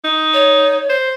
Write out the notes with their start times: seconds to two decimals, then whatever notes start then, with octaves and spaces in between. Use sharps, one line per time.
0.04 D#4
0.34 C#5
0.89 C5